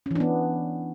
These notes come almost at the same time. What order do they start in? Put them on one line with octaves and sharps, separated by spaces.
C#4 E3 D4 B3